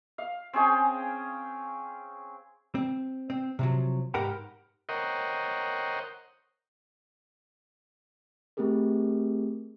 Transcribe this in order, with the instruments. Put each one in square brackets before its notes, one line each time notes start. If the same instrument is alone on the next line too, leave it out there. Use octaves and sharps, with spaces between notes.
[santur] F5
C4 C#4 G#4 G5
[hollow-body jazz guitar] C4
C4
C3 F3 F#3
G#2 G4 A#4 F#5 G5 B5
[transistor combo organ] A#4 C5 C#5 D#5 F#5 G5
[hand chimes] A3 C4 G4 G#4 A#4